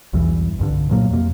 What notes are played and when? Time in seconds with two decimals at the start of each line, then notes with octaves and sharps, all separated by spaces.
0.13 B1 E2 G2 E3
0.59 C2 G2 D3
0.90 A#2 F#3 A#3
1.11 F2 C3 A#3